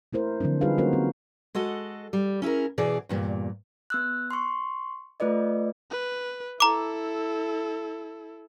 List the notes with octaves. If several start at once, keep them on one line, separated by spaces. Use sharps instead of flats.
A3 E4 A#4 C5
D3 F3 F#3 C4 D4
G3 D#4 F4 G#4 B4 F5
F#3 A#3 C#4 F#4 A#4 C5
C4
G#3 F#4 A4 D#5
G3
C#4 E4 G#4 A#4
B2 E3 G#4 D5
E2 G2 A#2
B3 E6 F#6
C6 C#6
A3 F4 B4 D5 D#5
B4
E4 A4 A#5 D6